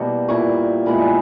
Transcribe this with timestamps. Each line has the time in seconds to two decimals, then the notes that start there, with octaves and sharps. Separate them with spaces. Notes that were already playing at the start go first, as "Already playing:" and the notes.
Already playing: B2 G3 A#3 E4 C#6
0.28 A#2 A#3 E4 C#6
0.86 A#2 G#3 B3 E4 B5
0.97 C#6